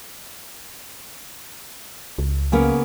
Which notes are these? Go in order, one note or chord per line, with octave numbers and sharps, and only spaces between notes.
C#2
C#3 A#3 B3